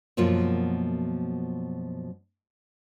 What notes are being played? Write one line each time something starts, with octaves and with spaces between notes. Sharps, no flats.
F#2 B2 F3 A#3 F4